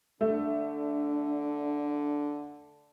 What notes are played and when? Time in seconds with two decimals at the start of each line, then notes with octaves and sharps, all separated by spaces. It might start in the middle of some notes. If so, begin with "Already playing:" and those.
0.21 D3 A3 D4